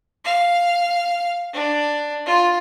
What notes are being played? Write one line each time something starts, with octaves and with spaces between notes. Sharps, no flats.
F5
D4
F4